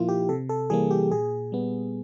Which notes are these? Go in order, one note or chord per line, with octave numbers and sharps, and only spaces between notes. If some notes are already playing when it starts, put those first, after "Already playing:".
Already playing: A#2 F3 A#3 E4 F4
G4
C3 A4
A4
E3 G3 A#3 G#4
G4
A#2 G#4
G3 B3